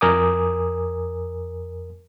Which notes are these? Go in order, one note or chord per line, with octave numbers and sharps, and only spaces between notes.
F2 A#4 G#5 D6 D#6